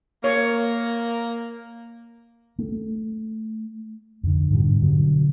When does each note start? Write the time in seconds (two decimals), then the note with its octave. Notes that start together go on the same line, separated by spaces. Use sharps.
0.24 A#3 C#5
2.59 A3
4.23 F2 D3
4.51 G#2 B2 D3 G3
4.82 B2 D3 F#3